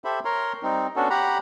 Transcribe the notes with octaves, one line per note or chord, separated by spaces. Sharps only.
G4 A4 C5 E5 B5
A#4 C#5 A#5 C6
G3 C4 D#4
B3 C#4 D4 F#4 A4
G4 F#5 A#5 B5